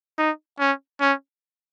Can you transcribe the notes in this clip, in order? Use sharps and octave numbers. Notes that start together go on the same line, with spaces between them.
D#4
C#4
C#4